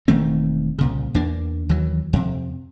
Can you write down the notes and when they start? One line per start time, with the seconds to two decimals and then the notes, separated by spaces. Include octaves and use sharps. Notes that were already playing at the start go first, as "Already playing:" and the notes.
0.08 E1 D#3 A3 C4
0.79 C2 A#2 C#3
1.14 E2 A#3 D4
1.69 D#2 E3 F#3
2.13 F2 C3